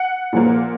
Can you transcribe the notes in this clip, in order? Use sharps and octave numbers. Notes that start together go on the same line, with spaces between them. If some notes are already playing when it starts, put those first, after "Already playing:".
Already playing: F#5
A#2 F3 A#3